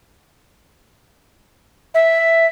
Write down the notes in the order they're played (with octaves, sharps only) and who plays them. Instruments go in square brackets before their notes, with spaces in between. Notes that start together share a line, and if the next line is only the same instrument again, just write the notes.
[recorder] E5